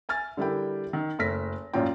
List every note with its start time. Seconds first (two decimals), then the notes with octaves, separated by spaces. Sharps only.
0.09 E5 G#5 F6 A6
0.37 D3 G3 E4 A#4 G5
0.93 D#3
1.19 F#1 A3 E5 F6 A#6 B6
1.73 A1 F#2 A#2 C#4 F4 G5